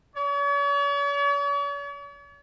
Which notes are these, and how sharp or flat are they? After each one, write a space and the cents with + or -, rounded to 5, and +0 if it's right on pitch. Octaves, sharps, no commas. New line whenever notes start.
C#5 +45